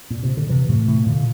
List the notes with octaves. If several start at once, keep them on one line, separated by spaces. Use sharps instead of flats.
A#2
C3
D3
C3 E3
A2 C3
A2 C3
A#2 D3